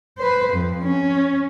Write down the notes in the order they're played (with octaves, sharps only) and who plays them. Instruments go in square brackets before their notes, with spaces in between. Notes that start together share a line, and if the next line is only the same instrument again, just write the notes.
[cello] B4 C5
F2
C#4